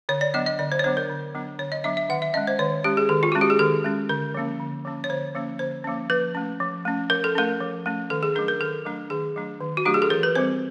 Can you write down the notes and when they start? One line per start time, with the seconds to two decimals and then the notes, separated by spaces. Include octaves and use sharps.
0.09 D3 C#5
0.21 D5
0.34 F#3 B3 D4 D#5
0.46 D#5
0.59 D3 D5
0.72 C5
0.79 C#5
0.84 F#3 B3 D4 C5
0.97 A#4
1.10 D3
1.35 F#3 B3 D4
1.59 D3 C#5
1.72 D#5
1.84 F#3 B3 D4 E5
1.97 E5
2.09 D#3 F#5
2.22 E5
2.34 G#3 C#4 D#5
2.47 C5
2.59 D#3 C#5
2.84 G#3 C#4 G4
2.97 G#4
3.09 D#3 A4
3.23 F4
3.32 G#3 C#4 F#4
3.41 G4
3.50 G#4
3.59 D#3 A4
3.84 G#3 C#4
4.09 D3 A#4
4.34 F3 A#3 C#4
4.60 D3
4.85 F3 A#3 C#4
5.04 C#5
5.09 D3 C5
5.35 F3 A#3 C#4
5.59 D3 C5
5.84 F3 A#3 C#4
6.10 F3 B4
6.35 A3 C#4
6.60 F3
6.85 A3 C#4
7.10 F3 A#4
7.24 A4
7.35 A3 C#4 A#4
7.60 F3
7.86 A3 C#4
8.10 D#3 A4
8.23 G#4
8.35 F#3 A3 D4 A#4
8.48 A#4
8.60 D#3 A4
8.85 F#3 A3 D4
9.10 D#3 G#4
9.36 F#3 A3 D4
9.61 D#3
9.77 F#4
9.85 F#3 A3 D4 G4
9.94 G#4
10.02 A4
10.10 E3 A#4
10.23 B4
10.35 G3 C4 C5